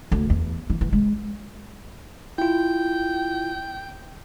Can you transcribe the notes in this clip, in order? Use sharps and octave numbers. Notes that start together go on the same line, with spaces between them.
D2
E2
E3
E3
G#3
E4 F4 G5